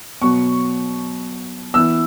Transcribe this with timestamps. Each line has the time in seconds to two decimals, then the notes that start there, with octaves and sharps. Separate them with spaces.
0.22 B2 F#3 B3 C#6
1.74 E3 B3 E6